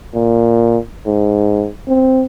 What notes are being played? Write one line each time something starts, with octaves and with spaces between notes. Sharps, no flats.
A#2
G#2
C4